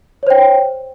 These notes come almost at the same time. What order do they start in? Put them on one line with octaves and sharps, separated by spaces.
C#5 C5 G5